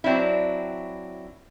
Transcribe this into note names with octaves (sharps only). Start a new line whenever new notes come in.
F#3 C4 D4 E4